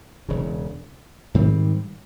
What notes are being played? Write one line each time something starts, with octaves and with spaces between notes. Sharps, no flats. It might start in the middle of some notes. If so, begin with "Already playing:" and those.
E1 E2 C#3
G#2 D#3 G3 C4